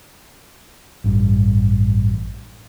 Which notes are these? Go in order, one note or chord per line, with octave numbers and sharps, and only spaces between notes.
A1 G2